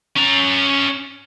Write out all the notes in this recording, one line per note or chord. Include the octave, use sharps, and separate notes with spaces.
C#4 A#5